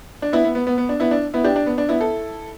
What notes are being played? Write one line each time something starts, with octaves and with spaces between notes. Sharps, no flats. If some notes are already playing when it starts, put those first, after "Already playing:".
D4
B3 E4
B3
B3
B3
B3
D4
B3 E4
D4
B3 E4
D4 G4
D4
B3
D4
B3 E4
E4 A4